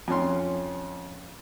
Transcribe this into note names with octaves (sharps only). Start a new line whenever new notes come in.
F2 C#4 C6